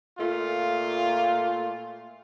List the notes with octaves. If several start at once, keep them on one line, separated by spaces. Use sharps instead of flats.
A#2 A3 F4